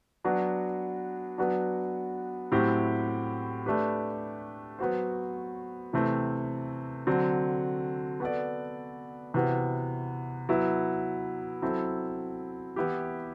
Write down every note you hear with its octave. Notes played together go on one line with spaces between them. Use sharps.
F#3 B3 D4 F#4
F#3 B3 D4 F#4
A2 F#3 C4 E4 G4
A3 D4 G4 B4
F#3 B3 F#4 C5
C3 E3 A3 C4
D3 F#3 C4
B3 F#4 A4 D5
C3 E3 B3 F#4
F#3 B3 E4
F#3 C4 E4 A4
E3 B3 E4 G4